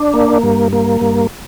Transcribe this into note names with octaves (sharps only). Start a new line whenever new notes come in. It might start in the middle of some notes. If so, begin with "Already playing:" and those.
Already playing: D4
A#3
G2
A#3
G2